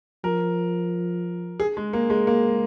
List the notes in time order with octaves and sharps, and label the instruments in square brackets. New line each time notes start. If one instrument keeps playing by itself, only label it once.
[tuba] F3 [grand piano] A#4
[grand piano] G#4
G#3
A#3
G#3
[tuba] G#3 [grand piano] A#3